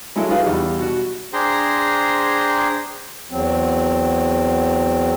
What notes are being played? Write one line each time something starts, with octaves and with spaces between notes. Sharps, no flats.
F#3 G#3 E4 A4
F4 G#4 B4
E2 G3 D#4
B2 F#4
D4 G#4 C5 G5 A#5 C6
E2 F#3 C4